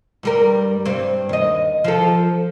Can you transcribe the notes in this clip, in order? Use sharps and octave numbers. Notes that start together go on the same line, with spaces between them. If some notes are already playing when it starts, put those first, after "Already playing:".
G2 G3 A#4
G2 C4
D#2 D#5
F3 A4